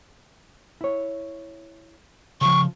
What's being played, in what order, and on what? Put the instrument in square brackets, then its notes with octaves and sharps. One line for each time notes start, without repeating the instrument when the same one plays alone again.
[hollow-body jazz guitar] E4 C#5
[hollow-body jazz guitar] C#3 F3 [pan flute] C#6